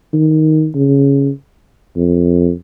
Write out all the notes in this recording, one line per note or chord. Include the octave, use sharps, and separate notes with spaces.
D#3
C#3
F2